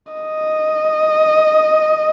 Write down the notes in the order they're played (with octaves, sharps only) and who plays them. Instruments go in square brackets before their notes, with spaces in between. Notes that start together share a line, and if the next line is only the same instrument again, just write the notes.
[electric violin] D#5